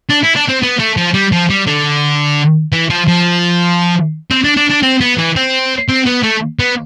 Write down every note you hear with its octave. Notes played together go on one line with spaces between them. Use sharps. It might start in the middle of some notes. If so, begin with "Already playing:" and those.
D4
E4
D4
C4
B3
A3
F3
G3
F3
G3
D3
E3
F3
F3
C4
D4
D4
D4
C4
B3
E3
C4
C4
B3
A3
B3